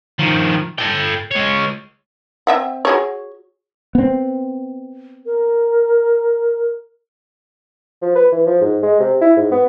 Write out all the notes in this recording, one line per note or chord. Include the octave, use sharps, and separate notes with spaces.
D#3 F3
A4 G5
G#3 C#5
C4 E5 F#5
F#4 G#4 C#5
B3 C4
A#4
F3
B4
E3
F3
G#2
G#3
C3
E4
G#2
B3